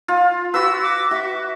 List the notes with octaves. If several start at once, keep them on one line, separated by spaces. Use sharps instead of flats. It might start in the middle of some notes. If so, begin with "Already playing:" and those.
F4
F#4 B4 E6
D6
F#4 E5